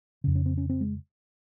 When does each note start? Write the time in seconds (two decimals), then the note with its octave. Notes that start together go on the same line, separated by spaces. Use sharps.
0.24 F2 C#3
0.35 C#4
0.46 C4
0.58 C#4
0.70 C4
0.81 G#3